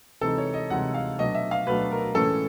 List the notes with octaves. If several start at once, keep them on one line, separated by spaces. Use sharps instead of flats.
C3 E3 G#3 C4 D#4 A4
C#5
D#5
C3 E3 G#3 C4 D#4 F#5
F5
B2 F#3 A3 D4 D#5
E5
F5
B2 F#3 A3 D4 B4
A#4
A2 E3 G#3 C#4 A4